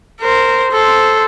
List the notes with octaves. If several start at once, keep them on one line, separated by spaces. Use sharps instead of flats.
A#4 C5
A4 C5